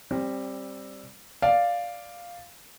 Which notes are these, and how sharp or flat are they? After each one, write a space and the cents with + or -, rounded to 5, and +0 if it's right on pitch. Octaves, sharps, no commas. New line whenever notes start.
G3 +0 C4 +20
D5 +0 F5 +0